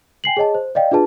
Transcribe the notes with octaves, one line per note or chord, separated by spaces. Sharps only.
G5 G#5 C7 F#7
G#4 C#5 D#5 A5
C5
D5 D#5 F5 G5
D4 F4 G#4 B4 A5